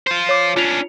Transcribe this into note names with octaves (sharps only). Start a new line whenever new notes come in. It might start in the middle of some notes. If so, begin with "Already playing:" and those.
F4 C5
C#5 D6
C#4 D4 F4 F7